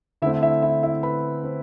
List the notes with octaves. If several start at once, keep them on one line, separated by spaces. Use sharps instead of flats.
D3 A3 C4 E4 E5
E4 E5
E4 E5
E4 E5
B4 B5
C4 C5